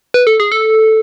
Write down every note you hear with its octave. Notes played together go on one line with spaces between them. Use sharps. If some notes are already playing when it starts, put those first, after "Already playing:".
B4
A4
G#4
A4